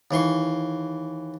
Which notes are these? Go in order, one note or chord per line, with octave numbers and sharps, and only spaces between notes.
D#2 E3 C6 C#6